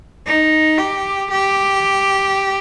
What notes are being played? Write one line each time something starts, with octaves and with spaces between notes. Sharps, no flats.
D#4
G4
G4